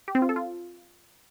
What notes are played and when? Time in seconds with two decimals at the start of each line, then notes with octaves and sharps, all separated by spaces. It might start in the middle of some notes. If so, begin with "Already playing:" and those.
0.08 G4
0.15 C4
0.22 F4
0.29 A4
0.36 F4